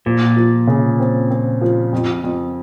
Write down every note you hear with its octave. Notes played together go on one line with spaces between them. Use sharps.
A#2 F3
F3
C#3
C4
C4
F3
F2
F2